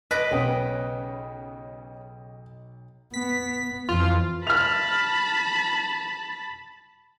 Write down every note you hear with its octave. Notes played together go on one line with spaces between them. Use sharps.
B4 D#5 D6 F#6 A#6
B1 C#3 B3 C#4 G5 D#6
B3 B6
F2 E3 F4
A5 B5 F6 F7